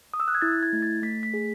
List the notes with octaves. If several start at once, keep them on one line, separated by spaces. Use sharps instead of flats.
D#6
E6
F#6
G#6
E4 A6
G#6
A3
A6
A3 B6
B6
G#4